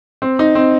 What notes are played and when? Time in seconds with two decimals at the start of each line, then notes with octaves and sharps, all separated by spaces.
0.22 C4
0.39 D#4
0.55 C4